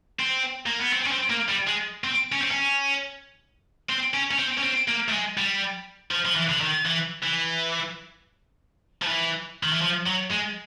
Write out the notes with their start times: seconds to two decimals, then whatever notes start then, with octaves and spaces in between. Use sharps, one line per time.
0.19 C4
0.66 A#3
0.80 B3
0.93 C4
1.06 C#4
1.12 C4
1.30 A#3
1.49 G3
1.68 G#3
2.04 C4
2.32 C#4
2.42 C4
2.51 C#4
3.90 C4
4.14 C#4
4.31 C#4
4.39 C4
4.58 C#4
4.63 C4
4.88 A#3
5.09 A3
5.12 G#3
5.37 G3
6.11 F3
6.26 F3
6.36 E3
6.49 D3
6.61 D#3
6.85 E3
7.23 E3
9.02 F3
9.07 E3
9.63 D#3
9.72 E3
9.82 F3
10.06 F#3
10.31 G#3